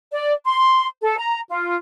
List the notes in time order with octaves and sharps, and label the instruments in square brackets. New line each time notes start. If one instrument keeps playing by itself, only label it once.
[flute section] D5
C6
A4
A#5
F4